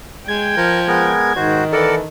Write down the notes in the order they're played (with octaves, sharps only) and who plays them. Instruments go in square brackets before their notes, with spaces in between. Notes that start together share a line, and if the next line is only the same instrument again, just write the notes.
[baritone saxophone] G#3 [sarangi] G5 [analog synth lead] G#6
[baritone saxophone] F3 [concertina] A#4
[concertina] G#3 B3 A#4
[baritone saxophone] G#2 [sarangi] D#3 [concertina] F#4 C5
[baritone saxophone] E3 [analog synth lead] A4 [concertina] A#4 D5 F#5